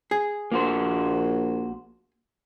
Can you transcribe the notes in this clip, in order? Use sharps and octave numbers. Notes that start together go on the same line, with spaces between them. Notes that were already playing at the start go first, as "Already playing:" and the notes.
G#4
A#1 A#3 F#4 C5